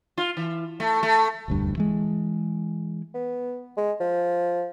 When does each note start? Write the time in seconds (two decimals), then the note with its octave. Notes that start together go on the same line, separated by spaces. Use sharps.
0.18 F4
0.37 E3
0.80 A3
1.03 A3
1.48 E1 D2 G2
1.77 E3 G#3
3.15 B3
3.77 G#3
4.00 F3